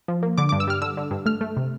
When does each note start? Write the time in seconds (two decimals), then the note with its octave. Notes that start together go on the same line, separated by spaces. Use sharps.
0.08 F3
0.23 A#3
0.38 D3 D6
0.49 D6
0.52 G2
0.60 E6
0.67 G3 F6
0.82 D3 E6
0.97 D3
1.11 G2
1.26 A3 F6
1.41 A3
1.57 C3